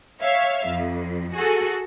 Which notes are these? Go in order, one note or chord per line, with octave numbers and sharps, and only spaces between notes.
C#5 E5 F5
F2
F#4 G#4 A4